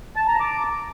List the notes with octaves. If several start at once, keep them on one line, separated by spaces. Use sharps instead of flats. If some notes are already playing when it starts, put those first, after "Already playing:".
A5
A#5
D6